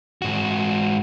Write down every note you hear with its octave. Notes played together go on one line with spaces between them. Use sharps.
G#2 F#4